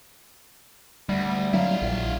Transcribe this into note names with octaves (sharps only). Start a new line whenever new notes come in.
D2 G3
F#3 E4 F5
A#1